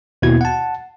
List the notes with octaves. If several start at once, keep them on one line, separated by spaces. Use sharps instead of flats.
D#2 B2 B3 E4 F#4 G#6
F#5 A5